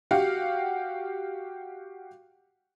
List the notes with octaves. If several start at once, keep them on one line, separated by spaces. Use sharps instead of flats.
F#4 G4 F5 F#5